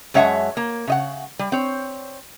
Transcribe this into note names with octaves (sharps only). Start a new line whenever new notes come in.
F#2 G#3 C#5 E5 F#5 A5
A#3
C#3 D#5 F#5
G3
C4 C#5